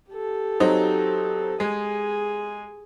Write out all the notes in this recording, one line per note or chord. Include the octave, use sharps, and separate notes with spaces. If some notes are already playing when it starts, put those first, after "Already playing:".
G4 A4
F#3 C4 D#4
G#3 G#4 G#5